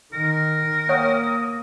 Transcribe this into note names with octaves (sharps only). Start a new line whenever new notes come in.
D#3 A#4
A#3 C#5 F#5 G5 D#6